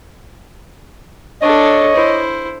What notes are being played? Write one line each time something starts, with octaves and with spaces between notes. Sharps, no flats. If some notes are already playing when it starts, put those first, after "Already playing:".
D4 A4 C#5 D#5
E4 C5